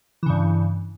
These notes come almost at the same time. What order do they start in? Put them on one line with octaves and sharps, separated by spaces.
E3 C#3 G2